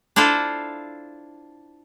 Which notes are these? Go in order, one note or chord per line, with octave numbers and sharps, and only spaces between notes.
D4 E4 F4 A4 C5